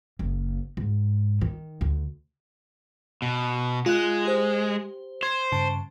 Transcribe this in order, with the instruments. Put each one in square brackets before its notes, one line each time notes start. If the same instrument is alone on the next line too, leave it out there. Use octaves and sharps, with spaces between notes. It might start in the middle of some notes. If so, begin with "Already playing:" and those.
[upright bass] F#1
G#2
D#3
D2
[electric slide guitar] B2
[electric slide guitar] G#3 [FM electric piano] F4 F#6
[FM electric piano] G4 C5
[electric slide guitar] C5 [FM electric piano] G#6
[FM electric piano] G2 C#3 A5